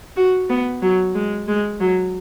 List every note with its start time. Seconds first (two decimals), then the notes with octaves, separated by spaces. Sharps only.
0.16 F#4
0.49 B3
0.82 F#3
1.14 G#3
1.48 G#3
1.80 F#3